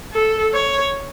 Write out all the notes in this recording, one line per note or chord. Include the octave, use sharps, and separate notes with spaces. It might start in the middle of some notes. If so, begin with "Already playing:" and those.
A4
C#5